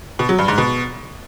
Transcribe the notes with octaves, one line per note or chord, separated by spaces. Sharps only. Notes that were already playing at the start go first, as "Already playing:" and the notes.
B2
F#3
G2
G#2
B2